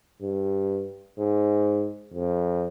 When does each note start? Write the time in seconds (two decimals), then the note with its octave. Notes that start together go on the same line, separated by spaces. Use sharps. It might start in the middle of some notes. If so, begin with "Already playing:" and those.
0.22 G2
1.18 G#2
2.14 F2